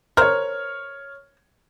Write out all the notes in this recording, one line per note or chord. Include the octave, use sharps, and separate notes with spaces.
A#4 C5 C#5 F6